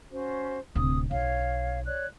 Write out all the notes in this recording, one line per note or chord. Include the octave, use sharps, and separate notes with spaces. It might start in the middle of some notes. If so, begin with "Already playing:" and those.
C#4 F#4 C5
D1 C3 D#6
B1 C#5 F5
C#5 D5 F#6